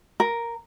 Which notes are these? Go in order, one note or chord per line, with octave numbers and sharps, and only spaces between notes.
A#4